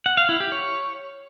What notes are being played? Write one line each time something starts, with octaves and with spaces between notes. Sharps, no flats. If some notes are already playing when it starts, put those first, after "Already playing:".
F#5
F5
E4
G4
C#5